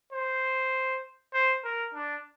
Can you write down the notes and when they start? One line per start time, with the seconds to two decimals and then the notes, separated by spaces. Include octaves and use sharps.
0.13 C5
1.34 C5
1.64 A#4
1.94 D4